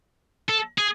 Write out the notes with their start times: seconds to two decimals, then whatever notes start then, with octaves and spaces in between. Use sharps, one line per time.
0.49 A4
0.78 G#4